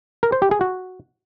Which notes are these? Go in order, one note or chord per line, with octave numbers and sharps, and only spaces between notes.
A#4
C5
G4
G#4
F#4